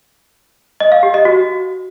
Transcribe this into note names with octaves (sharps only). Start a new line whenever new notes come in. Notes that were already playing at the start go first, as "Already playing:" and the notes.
D#5
F5
G4
D#5
F#4